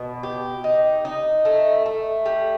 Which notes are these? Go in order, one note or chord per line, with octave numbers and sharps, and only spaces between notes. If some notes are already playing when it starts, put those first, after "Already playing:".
Already playing: B2
G4
D#4
D#4
A3
A3
G3